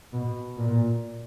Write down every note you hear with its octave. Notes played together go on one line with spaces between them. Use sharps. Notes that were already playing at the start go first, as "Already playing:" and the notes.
B2
A#2